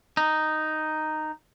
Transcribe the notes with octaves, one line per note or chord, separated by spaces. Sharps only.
D#4